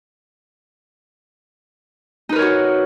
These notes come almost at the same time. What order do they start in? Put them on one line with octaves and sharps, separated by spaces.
D#4 B4 A#4 C#5 F#4